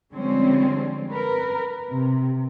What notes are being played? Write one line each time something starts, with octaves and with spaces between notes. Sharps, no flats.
D3 F3 G3 G#3 C4 C#4
A#4 B4
C3